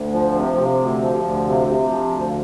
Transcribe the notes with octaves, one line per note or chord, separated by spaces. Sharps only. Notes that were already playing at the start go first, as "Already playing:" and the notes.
Already playing: D2
F3
C3
C3
D2
F3
D2
C3
C3
F3
D2